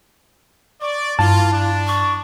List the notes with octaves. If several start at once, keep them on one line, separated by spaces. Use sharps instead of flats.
D5 C#6
G2 A#3 E4 F4 A5
D4
C#6